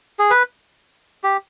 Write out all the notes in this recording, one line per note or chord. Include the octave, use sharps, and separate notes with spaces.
G#4
B4
G4